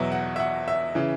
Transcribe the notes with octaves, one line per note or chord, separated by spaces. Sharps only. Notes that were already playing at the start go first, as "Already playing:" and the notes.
Already playing: E2 B2 F#3 E5
F#5
E5
F#5
E5
C#3 E3